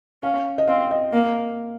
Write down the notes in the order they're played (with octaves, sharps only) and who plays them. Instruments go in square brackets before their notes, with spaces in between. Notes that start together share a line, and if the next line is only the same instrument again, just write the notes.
[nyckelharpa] C#4 [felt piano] F5
[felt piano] D#5
[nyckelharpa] C4 [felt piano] F5
[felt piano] D#5
[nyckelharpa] A#3 [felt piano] F5